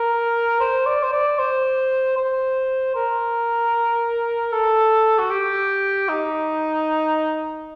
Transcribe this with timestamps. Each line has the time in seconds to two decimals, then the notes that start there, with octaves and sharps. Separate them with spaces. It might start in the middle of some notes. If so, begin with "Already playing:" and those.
Already playing: A#4
0.60 C5
0.86 D5
1.03 C5
1.13 D5
1.39 C5
2.17 C5
2.95 A#4
4.52 A4
5.19 F#4
5.31 G4
6.09 D#4